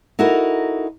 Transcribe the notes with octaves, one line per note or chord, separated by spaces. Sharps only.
D#4 E4 F#4 A4 A#4